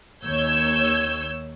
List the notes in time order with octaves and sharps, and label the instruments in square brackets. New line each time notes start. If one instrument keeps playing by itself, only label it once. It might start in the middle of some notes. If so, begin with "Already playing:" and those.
[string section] D#2 C#5 E6 G6 G#6